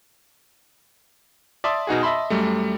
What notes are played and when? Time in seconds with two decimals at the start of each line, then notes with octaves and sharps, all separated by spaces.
1.64 D5 E5 A5 C6 D6 D#6
1.87 B2 D#4 F#4 G#4
2.03 D#5 E5 A5 B5 C6
2.30 F#2 G3 A3